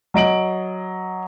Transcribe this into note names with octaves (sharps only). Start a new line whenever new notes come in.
F#3 D#5 D7 F#7